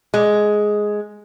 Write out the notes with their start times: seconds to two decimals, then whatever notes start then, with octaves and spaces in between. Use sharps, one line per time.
0.14 G#3